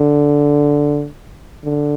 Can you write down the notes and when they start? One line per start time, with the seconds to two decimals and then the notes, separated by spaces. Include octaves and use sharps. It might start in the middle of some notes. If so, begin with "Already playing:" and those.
Already playing: D3
1.64 D3